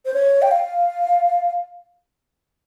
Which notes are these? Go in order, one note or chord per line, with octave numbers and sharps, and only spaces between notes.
C5
C#5
G5
F5